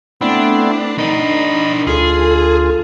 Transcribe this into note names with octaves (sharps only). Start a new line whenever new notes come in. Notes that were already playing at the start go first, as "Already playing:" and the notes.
A3 B3 C4 D4 E4
D4 D#4 A#4 D#5 B5
D2 F4 G#4 A4